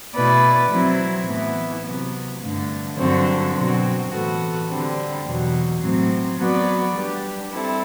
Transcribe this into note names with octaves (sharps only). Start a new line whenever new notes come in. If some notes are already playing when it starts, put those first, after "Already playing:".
B2 A3 E4 B4 D5
F#3 C4 E4
A2 E3 B3 E4
C3 F#3 B3
G2 D3 A3
G2 D3 F#3 C4 F#4
B2 F#3 C4 F#4
A2 E3 B3 F#4 A4
D3 G3 C4
E2 B2 F#3
A2 F#3 C4
F#3 B3 F#4 B4 D5
G3 D4 G4 B4
G3 C4 E4 A4